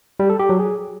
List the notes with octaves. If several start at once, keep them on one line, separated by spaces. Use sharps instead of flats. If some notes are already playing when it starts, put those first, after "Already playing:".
G3
A4
G4
F#3
G#4